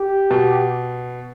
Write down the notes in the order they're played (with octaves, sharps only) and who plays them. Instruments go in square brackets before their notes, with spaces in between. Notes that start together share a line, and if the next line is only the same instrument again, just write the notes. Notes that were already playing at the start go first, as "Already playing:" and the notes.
Already playing: [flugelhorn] G4
[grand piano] B2